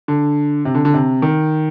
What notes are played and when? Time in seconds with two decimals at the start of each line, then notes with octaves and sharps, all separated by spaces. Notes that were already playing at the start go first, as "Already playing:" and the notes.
0.08 D3
0.65 C3
0.75 D3
0.85 D3
0.94 C3
1.22 D#3